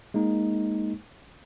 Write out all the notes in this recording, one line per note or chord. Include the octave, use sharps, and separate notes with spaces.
G#3 A#3 D#4